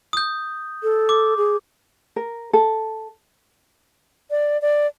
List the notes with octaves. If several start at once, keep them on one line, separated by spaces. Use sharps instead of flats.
D#6 G6
A4
D6
G#4
A#4
A4
D5
D5